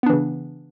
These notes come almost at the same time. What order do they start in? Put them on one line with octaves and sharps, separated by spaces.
B3 D4 E3 C#3